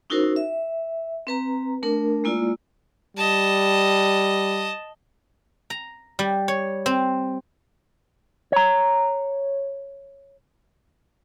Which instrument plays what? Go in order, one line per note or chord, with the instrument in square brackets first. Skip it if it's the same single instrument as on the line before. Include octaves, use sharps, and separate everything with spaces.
[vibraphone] C#4 D#4 E4 F#4 A#4 C5
E5
C4 B4 A#5
A3 D4 A#4
G#3 A#3 E4 F4 D5
[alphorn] G3 [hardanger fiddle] D#5 A5
[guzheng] A#5
G3
C#5
C4
[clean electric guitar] C#5 A#5